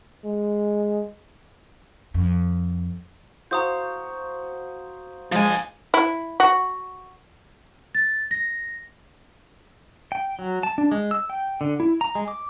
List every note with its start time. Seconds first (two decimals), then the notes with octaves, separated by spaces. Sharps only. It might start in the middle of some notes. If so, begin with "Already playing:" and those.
0.25 G#3
2.14 F2
3.51 F#4 C5 F5 A#5 D#6 G6
5.32 F3 G#3 G#5
5.94 E4
6.40 F#4
7.95 A6
8.31 A#6
10.12 G5
10.39 F#3
10.63 A5
10.78 D4
10.92 G#3
11.11 E6
11.30 G5
11.61 D3
11.80 E4
12.01 A#5
12.15 G#3
12.28 D6